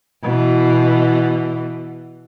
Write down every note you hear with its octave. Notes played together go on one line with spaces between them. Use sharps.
B2 E3